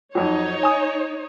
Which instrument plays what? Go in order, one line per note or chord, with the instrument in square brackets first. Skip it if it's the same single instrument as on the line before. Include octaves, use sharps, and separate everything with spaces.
[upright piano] F2 F3 F#3 [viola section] D#4 C#5
[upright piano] G#5 D#6